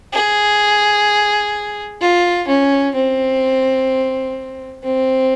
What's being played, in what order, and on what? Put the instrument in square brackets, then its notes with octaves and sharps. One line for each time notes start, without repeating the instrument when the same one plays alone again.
[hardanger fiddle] G#4
F4
C#4
C4
C4